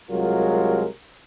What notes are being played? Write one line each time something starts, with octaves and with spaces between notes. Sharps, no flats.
C2 F#3 G#3 F4 A#4